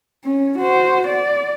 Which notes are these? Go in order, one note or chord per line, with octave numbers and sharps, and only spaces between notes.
C#4
F#4 C5
D5